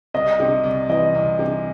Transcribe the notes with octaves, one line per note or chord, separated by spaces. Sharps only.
C2 D#5
C3
C2
E3 D#5
C2
C3